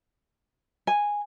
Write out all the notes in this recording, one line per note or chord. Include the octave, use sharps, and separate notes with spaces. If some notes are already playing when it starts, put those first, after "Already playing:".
G#5